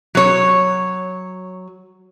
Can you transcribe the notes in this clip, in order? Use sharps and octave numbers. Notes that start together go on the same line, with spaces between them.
F#3 C#5